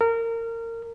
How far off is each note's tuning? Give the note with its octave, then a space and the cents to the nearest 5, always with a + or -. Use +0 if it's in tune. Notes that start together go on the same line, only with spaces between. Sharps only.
A#4 -25